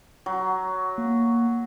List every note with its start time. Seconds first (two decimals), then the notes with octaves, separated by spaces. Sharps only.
0.26 F#3
0.98 A#3